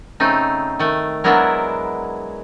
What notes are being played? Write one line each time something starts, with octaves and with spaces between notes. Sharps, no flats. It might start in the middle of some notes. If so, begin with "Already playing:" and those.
C#3 A3 C4 D#4
D#3 A3
F#3 G#3 B3 D4 E4 A#4